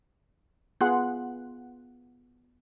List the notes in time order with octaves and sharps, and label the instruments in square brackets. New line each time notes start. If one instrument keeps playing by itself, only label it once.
[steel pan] B3 F4 G#4 [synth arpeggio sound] F#5 C6 F#6